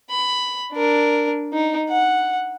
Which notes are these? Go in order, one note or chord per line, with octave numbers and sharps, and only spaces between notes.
B5
D4 A#4
D#4
F#5